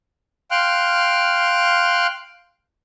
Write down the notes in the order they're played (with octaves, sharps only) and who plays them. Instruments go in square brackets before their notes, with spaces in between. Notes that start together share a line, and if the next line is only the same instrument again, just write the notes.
[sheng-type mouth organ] F5 G5 C6 F6 F#6